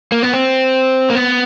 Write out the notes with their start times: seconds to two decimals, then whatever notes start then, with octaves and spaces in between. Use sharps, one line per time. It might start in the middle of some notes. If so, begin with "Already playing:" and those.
0.12 A#3
0.23 B3
0.34 C4
1.10 A#3
1.15 B3